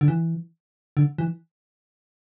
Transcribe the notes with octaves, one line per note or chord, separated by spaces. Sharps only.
D3
E3
D3
E3